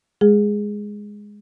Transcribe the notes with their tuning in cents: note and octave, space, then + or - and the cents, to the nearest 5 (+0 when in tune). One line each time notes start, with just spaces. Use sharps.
G#3 -5 G#4 +0